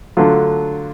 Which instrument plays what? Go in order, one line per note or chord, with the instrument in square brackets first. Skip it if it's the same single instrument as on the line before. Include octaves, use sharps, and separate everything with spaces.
[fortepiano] D3 F#3 A3 F4